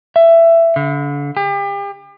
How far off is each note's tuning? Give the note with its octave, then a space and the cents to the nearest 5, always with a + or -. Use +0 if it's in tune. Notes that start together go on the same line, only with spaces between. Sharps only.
E5 +15
D3 -35
G4 +35